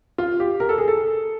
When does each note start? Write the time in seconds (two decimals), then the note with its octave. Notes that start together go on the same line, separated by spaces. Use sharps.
0.18 F4
0.40 G4
0.60 A#4
0.69 A4
0.78 G#4
0.88 A4